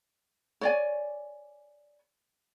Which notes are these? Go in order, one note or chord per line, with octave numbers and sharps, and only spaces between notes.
C#5 D5 G#5